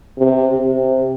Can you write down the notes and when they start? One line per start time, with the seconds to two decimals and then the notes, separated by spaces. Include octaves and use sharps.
0.18 C3
0.56 C3